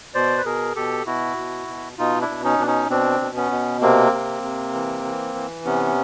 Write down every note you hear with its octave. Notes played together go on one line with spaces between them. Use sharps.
B2 C5 D5
B4
B2 G#4 A#4
B2 G4 A4
B2 E4 F#4
B2
B2
B2 D#4 F4
D4 E4
B2
C#4 D#4
B2 D4
C#4 D#4
B2 C4 D4
B2
B3 C#4
B2
C3 A#3 C4
C3
C3
E3
E3
E3
C3 B3 C#4